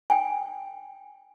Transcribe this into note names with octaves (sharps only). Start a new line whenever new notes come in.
G5 G#5